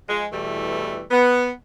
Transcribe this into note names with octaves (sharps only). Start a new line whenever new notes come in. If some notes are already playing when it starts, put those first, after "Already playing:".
F3 G#3
E2 B2 E3 G3 A3
B3